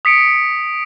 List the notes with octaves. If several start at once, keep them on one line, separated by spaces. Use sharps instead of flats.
D#6 B6 C#7 D7